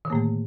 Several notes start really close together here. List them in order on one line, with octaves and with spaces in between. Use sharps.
D#3 D3 A#3 A2 A3